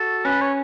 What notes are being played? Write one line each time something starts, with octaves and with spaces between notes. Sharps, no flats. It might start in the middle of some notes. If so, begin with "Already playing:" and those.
Already playing: F#4 A4
C#4 B4
C#5